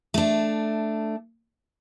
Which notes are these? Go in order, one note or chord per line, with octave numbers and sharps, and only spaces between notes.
A3 D4